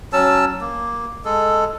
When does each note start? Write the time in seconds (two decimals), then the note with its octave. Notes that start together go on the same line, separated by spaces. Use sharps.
0.13 F#3 C#4 A5 E6
0.61 A#3
1.25 G#3 A4